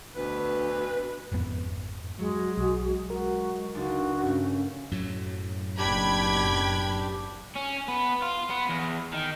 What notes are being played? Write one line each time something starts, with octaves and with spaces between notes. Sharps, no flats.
D2 B2 B4
G#1 F2 B3
F#3 G#3 F#4
B1
G#3 F#4 A#4
C#2 D4 D#4 F#4
G2 A3 C#4
F#2 A2 F#3
F#1 B2 D4 G4 G5 B5 G#6
C#4
B3
F4
B3
E2
D#3